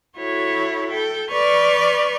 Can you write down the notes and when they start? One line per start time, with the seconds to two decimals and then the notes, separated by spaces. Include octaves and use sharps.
0.16 E4 F#4 A4 C#5
0.88 A4 G5
1.29 B4 D5 C#6 F6 G6